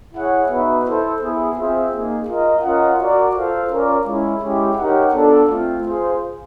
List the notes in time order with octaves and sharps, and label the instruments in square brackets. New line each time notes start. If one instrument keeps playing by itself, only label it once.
[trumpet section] E4 G#4 C#5 F#5
B3 D#4 F#4 B4 E5
E4 A4 C5
B3 E4 G#4
C4 F4 G#4 C5 E5
A#3 D#4 G#4
F4 A#4 D#5
C#4 F4 A#4 D#5 F#5
F#4 A#4 D5
F4 A4 C5 F5
C#4 F4 A#4 D5
G#3 C#4 E4
G#3 C#4 E4 G4
D#4 G4 A#4 C#5 F#5
B3 D4 F4 A4
A3 C4 F4
F4 G#4 C5